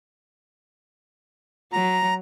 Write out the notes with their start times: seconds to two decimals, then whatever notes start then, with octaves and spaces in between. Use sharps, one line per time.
1.72 F#3 A#5